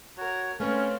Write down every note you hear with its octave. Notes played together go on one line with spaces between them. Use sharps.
F#4 A#4 C#5
A3 C4 C#4 B4 C#5 F5